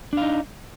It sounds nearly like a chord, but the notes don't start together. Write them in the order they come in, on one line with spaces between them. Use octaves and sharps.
D4 F5 D#4